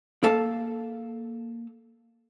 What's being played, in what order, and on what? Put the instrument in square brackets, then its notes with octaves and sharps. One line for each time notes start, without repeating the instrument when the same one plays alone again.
[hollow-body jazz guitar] A#3 A4 F5 A5